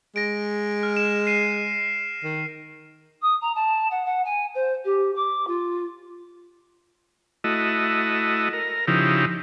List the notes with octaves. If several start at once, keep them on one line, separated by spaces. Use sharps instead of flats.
G#3 A#6 D7
F6
E7
C7 D#7
D#3
D#6
A#5
A5
F#5
F#5
G#5
C5
G4
D6
F4
A3 E4 F#4 D#5
A#4
C#3 F3 D#4 E4 G4